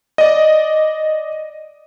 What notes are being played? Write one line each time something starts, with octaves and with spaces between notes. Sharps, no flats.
D5 D#5